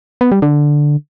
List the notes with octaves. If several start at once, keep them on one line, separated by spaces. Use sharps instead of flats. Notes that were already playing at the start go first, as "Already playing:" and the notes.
B3
G3
D3